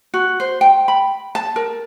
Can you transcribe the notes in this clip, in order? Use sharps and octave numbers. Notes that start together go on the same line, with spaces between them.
F#4
C5
G5
B5
A5
A#4